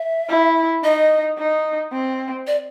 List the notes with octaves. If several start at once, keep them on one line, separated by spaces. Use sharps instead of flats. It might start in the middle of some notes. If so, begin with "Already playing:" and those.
Already playing: E5
E4
D#4 D#5
D#4
C4
D5